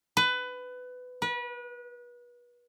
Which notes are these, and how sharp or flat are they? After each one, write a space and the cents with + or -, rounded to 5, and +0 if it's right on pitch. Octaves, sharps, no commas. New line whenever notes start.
B4 +20
B4 -30